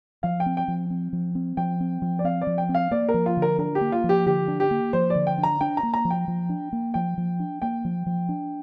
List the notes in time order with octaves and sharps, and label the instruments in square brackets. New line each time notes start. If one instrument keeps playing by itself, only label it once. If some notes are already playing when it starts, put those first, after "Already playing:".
[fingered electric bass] F3 [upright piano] F5
[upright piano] G5
[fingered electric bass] C4
[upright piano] G5
[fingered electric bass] F3
C4
F3
C4
[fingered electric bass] F3 [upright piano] G5
[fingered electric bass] C4
F3
[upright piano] D5
[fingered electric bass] C4 [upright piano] F5
[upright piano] D5
[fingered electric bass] F3
[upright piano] G5
[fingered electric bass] C4
[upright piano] F5
[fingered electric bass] A#3 [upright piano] D5
[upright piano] A#4
[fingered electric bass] F3
[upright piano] F4
[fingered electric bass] D3
[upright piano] A#4
[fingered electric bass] D4 [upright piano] A#4
[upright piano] G4
[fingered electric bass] A#3
[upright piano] F4
[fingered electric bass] F3
[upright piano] G4
[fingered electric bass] D3 [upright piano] G4
[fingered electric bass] D4
[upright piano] G4
[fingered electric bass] A#3
[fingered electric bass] F3 [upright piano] C5
[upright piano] D5
[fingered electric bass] D3
[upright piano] G5
[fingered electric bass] D4
[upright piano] A#5
[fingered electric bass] D4 [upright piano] G5
[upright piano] A#5
[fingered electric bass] A#3
[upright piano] A#5
[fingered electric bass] F3
[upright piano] G5
[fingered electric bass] F3
D4
A#3
[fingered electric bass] F3 [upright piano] G5
[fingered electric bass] F3
D4
[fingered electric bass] A#3 [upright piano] G5
[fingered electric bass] F3
F3
D4